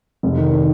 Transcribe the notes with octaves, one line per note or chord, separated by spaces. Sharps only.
F1
D#3